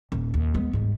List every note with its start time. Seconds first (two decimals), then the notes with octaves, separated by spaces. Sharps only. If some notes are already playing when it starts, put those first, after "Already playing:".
0.12 D#1
0.34 D#2
0.54 G#3 B3
0.73 G1 G#2